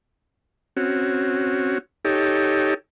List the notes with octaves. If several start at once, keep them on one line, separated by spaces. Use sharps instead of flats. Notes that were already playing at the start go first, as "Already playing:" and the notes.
C4 C#4 F#4
D#4 G4 A4 C#5